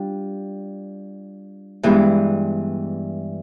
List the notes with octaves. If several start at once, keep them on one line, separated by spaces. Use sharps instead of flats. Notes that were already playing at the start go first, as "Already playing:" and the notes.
Already playing: G3 D4 F4
G2 E3 G#3 B3 D4